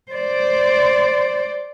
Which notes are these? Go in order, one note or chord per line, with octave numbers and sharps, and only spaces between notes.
C5 D5